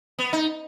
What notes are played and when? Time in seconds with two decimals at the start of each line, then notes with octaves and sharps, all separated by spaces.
0.19 B3
0.33 D#4